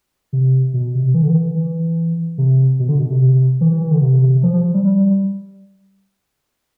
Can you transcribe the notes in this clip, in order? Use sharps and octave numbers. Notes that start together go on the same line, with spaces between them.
C3
B2
C3
E3
D3
E3
E3
C3
B2
D3
B2
C3
E3
E3
E3
D3
C3
C3
F3
F3
F3
G3
G3